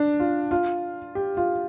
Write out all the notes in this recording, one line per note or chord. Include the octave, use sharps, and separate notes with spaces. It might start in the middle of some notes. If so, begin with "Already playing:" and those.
Already playing: D4
F4
F4
G4
F4